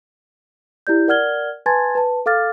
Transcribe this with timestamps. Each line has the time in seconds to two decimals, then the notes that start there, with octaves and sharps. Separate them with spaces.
0.87 E4 G4 D5 G6
1.08 A#4 D5 F#5 F6 G#6 G7
1.66 B4 G#5 A5 C6 G#6 A6
1.95 B4 A5
2.26 A4 F5 D6 F6 A6